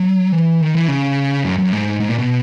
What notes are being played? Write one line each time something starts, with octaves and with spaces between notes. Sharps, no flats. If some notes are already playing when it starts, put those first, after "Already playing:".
Already playing: F#3
E3
D#3
E3
C#3
F#2
F#2
G#2
G#2
A#2
B2